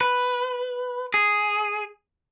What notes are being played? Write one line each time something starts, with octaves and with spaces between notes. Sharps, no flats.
B4
G#4